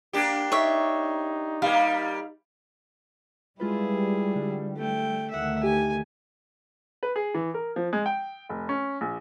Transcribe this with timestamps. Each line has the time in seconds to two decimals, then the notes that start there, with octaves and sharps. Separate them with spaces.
0.13 A#3 D4 G4
0.52 D#4 C#5 E5
1.62 G3 A#3 F5
3.60 G3 G#3 E4 F4 G#4 B4
4.36 D3
4.76 A3 G5
5.30 D2 D#3 A3 E5 F#5
5.63 G4 G#5
7.03 B4
7.16 G#4
7.34 E3
7.54 A#4
7.76 F3
7.93 G#3
8.06 G5
8.49 F1
8.69 C#4
9.01 A#1